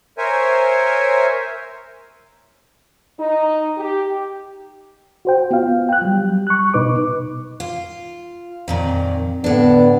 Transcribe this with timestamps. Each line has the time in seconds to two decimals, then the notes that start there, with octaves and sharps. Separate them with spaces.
0.18 A#4 C5 C#5 E5 G#5
3.18 D#4
3.78 G4
5.25 F#4 C5 G5
5.51 B3 F4 F5
5.89 G5 F#6
6.01 F#3 G3
6.47 C#6 F#6
6.74 B2 D#4 B4 D6
7.60 F4
8.68 F2 A#2 D#3
9.44 A2 D3 B3 D4